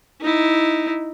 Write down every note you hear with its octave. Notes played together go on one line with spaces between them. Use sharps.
D#4 E4